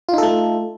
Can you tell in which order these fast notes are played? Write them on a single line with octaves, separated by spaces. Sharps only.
F4 D#4 A4 A3